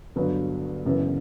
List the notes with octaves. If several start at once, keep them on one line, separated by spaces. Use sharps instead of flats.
G1 G2 F#3 B3
F#1 F#2 E3 B3